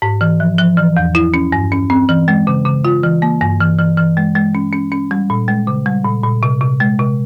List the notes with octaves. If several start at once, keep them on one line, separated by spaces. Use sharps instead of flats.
G#2
E3
F3
F3
E3
E2
E4
C#4
G2
C#4
C4
E3
G#3
C#3
C#3
F4
E3
A#3
G2
E3
E3
E3
G#3
G#3
C#4
C#4
C#4
G3
A#2
G#3
C#3
G3
A#2
A#2
C3
C3
G#3
C3